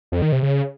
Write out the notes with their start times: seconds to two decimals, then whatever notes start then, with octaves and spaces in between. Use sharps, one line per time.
0.12 F2
0.22 D#3
0.32 C3
0.42 C#3